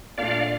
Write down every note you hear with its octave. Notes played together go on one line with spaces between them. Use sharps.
A#2 A3 D4 F4 D5 F5